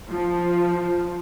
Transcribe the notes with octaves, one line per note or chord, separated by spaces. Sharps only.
F3